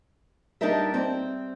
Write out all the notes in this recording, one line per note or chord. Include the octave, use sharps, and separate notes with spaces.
G3 D4 D#4 G4 A#4 E5
G3 C4